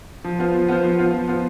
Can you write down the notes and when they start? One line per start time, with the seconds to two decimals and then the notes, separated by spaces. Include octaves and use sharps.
0.24 F3
0.39 B3 F4 C5
0.55 F3
0.68 B3 F4 C5
0.84 F3
0.98 B3 F4 C5
1.13 F3
1.28 B3 F4 C5